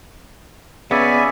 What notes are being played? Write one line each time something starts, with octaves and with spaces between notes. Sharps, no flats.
C#3 B3 D5 E5 G#5